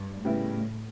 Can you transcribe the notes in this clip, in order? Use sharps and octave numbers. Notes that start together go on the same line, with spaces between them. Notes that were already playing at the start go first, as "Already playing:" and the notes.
Already playing: G2
A2 C#3 G3 B3 E4